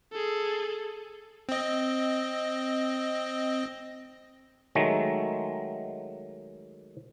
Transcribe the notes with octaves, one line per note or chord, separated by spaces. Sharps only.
G#4 A4
C4 D#5
D#3 F#3 G#3 A3